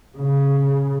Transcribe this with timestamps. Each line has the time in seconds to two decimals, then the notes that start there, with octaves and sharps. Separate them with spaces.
0.18 C#3